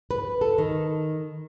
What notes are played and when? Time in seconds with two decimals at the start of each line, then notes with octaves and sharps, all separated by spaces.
0.11 B4
0.41 A4
0.58 D#3